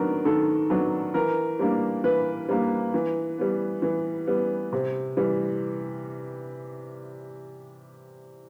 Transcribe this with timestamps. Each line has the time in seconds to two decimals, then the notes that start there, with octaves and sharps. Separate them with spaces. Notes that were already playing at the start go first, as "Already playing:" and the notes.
Already playing: D#3 F#3 B3 D4 A#4
0.25 D#3 A4
0.70 F#3 B3 D4
1.14 E3 A#4
1.59 G3 A#3 D4
2.04 E3 B4
2.49 G3 A#3 D4
2.94 E3
3.38 G3 B3
3.82 E3
4.27 G3 B3
4.73 C3
5.17 E3 G3